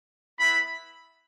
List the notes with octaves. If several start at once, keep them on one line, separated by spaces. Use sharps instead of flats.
B3 E4 B5